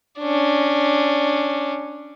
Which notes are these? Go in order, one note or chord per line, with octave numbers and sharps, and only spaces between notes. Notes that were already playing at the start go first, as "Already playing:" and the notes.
C#4 D4